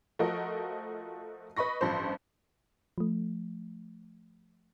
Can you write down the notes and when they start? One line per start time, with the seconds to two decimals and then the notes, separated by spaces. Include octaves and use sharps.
0.19 F3 A3 F#4 A#4 D#5
1.57 B4 D#5 B5 C#6 A#6
1.81 A1 G2 F3 C5
2.98 F3 A3